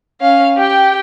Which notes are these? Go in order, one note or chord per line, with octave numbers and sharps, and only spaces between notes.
C#4 F5
G4 G5